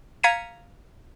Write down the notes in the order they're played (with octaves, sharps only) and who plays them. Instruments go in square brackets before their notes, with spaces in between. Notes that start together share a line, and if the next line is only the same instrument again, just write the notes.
[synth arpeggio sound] F5 A#5 G#6 B6 C#7 D#7